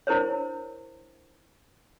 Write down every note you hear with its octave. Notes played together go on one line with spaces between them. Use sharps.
D4 E4 A#4 C5 C#5